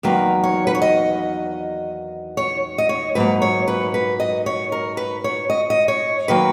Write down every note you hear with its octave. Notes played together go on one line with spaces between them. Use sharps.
E2 D#3 F#3 A#3 B4
C#5
B4
C#5
D#5
C#5
D#5
C#5
G#2 F#3 A#3 B4
C#5
B4
B4
D#5
C#5
A#4
B4
C#5
D#5
D#5
C#5
D#3 F#3 A#3 B4